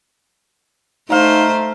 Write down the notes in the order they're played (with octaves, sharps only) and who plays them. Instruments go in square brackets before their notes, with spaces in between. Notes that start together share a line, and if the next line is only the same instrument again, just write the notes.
[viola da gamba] A3 C5 [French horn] D#4 [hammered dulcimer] F5 A#5